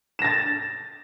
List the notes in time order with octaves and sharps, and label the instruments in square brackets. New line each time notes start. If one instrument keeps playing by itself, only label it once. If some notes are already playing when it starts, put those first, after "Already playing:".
[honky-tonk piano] E7
A#6
A6